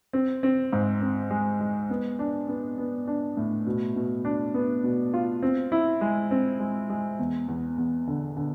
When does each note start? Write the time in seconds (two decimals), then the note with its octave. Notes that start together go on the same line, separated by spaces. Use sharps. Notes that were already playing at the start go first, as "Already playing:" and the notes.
0.13 C4
0.43 C4
0.73 G#2
1.01 C4
1.30 G#3
1.60 G#3
1.90 B3
2.19 D4
2.48 B3
2.78 B3
3.07 D4
3.37 A2
3.66 B2
3.96 B2
4.25 D4
4.54 B3
4.84 B2
5.14 F4
5.43 C4
5.72 E4
6.01 G#3
6.31 C4
6.59 G#3
6.90 G#3
7.19 E2
7.48 E2
7.78 E2
8.08 D3
8.37 D3